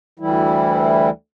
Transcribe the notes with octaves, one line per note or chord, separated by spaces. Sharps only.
D2 E3 G3 E4